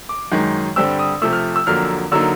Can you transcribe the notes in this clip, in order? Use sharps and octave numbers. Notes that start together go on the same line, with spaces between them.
D6
F#2 D#3 G#3
G2 D3 G3 C4 E6
D#6
C3 F3 A3 E6
F6
E6
F2 D3 F#3 A#3 F6
D3 F#3 A#3 D#4 E6